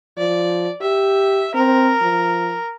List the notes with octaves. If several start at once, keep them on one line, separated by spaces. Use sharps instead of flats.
F3 D5
G4 E5
C4 A#4
F3